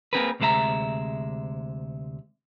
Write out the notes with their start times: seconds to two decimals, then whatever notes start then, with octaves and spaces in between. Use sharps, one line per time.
0.13 A#3 C4 D4 G#4 A#4 B4
0.40 D2 C3 G#3 A4 E5 A#5